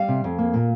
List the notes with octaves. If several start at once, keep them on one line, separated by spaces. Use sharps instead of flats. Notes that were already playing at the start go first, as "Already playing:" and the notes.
Already playing: G3 F5
C3
F2
A#3
A#2